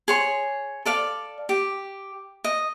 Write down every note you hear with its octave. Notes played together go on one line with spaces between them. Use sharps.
G#4 C#5 C6
A4 D5 F5
G4
D#5